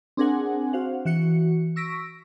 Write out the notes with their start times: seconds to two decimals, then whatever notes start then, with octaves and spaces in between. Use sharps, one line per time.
0.17 C4 D4 G#4 A#4 F#5 G#5
0.73 F#4 C5 F5 F#5
1.05 E3 F#4 C#7
1.76 C#6 E6 A#6 B6 D7